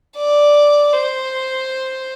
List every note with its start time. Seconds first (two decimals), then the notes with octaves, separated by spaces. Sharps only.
0.16 D5
0.92 C5